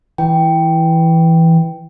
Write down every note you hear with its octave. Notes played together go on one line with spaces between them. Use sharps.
E3 G5